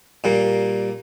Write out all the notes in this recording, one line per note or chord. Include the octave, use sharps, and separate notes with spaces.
A#2 G3 A#3